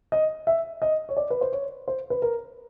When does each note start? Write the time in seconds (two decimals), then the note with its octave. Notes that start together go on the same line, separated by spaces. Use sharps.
0.12 D#5
0.47 E5
0.82 D#5
1.09 C#5
1.17 D5
1.30 B4
1.41 C5
1.53 C#5
1.88 C5
2.10 B4
2.22 A#4